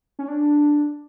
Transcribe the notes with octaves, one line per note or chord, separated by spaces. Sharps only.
C#4
D4